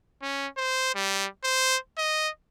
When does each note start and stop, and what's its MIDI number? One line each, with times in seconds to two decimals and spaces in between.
0.22 0.47 61
0.58 0.94 72
0.95 1.27 55
1.44 1.77 72
1.98 2.29 75